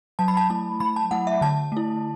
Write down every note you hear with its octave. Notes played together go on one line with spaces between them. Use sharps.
F#3 A5
B5
A5
A3 E4 A5
F#3 B5
A5
A3 E4 F#5
E5
D3 A5
A3 E4